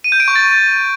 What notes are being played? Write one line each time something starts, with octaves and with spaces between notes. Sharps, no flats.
D#7
G6
D7
C#6
A6